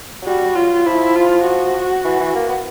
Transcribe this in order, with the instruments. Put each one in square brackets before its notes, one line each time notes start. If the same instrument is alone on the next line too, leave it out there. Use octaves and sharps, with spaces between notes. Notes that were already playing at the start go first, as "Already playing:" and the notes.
[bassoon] F#3
[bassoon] G3 [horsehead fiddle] F#4
[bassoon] G3
[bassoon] F#3 [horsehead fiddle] F4
[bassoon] F3 [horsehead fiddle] E4
[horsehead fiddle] F4
F#4
[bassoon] E3
E3
A#3
B3